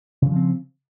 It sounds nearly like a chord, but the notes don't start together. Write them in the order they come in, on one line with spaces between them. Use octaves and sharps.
C#3 E3 F3 C4